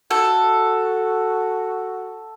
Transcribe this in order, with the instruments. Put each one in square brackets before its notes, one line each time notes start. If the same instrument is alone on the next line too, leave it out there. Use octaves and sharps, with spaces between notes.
[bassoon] F#4 [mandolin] A4